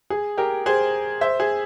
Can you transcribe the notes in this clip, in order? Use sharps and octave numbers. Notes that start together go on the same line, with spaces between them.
G#4
G4 A#4
G#4 C5
C5 E5
G#4